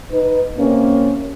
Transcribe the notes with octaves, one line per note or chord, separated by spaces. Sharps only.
D#4 B4
C3 A#3 C#4